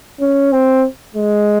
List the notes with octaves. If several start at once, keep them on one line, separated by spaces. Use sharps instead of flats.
C#4
C4
G#3